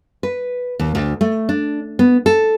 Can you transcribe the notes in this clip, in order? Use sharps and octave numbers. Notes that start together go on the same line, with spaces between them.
B4
D#2
D2
A3
D4
B3
A4